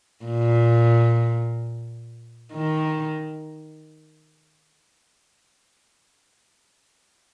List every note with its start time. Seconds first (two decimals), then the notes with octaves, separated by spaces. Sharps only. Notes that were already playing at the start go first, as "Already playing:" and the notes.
0.25 A#2
2.54 D#3